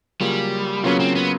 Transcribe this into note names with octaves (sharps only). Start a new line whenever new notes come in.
C#3 F#3 G3 A#3 C#4 F4
C#3 F#3 A#3 B3 C#4 F4
C4
B3